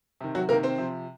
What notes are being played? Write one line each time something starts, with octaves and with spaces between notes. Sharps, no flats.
C3 D#3
F#3 F#4
C3 D#3 A#3 A#4
C4 C5
C3 F3